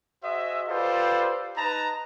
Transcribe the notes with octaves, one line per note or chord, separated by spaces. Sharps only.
F#4 G#4 C5 D#5 E5
F4 G4 A4 B4 C5 D5
D#4 B4 A5 A#5